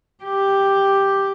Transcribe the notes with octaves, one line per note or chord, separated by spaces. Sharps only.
G4